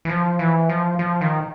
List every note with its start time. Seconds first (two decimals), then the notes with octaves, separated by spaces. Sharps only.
0.05 E3
0.09 F3
0.39 E3
0.69 F3
0.99 F3
1.21 D#3